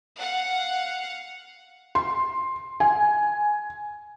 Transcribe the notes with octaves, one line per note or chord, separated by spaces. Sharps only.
F5 F#5
C6
G#5